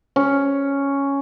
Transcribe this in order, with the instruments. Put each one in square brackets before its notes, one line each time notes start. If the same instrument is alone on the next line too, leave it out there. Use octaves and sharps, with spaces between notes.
[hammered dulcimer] C#4